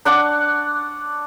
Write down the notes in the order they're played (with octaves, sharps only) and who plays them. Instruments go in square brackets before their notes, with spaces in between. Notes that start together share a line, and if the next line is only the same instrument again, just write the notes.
[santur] D4 F#5 C#6 D6